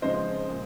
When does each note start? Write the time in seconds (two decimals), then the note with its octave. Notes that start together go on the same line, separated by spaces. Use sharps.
0.02 C#3 F3 G#3 C4 C5 D#5
0.49 A#2 G#3